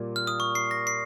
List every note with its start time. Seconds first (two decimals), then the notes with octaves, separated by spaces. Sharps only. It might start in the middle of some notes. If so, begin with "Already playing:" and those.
Already playing: A#2 G3 A#3 F4
0.16 F6
0.27 D#6
0.40 C#6
0.55 C7
0.71 A#6
0.87 C7